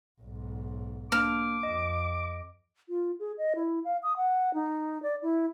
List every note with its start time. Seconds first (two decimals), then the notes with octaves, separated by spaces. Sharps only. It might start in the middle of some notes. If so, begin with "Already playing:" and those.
0.21 B1 G#2
1.12 A#3 D4 D6 F6
1.63 F2 D#5
2.89 F4
3.20 G#4
3.38 D#5
3.56 E4
3.85 F5
4.03 D#6
4.17 F#5
4.54 D#4
5.03 D5
5.22 E4